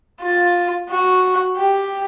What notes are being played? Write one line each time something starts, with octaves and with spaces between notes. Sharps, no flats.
F4
F#4
G4